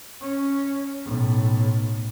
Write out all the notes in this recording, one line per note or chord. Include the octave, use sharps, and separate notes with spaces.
C#4
B1 A2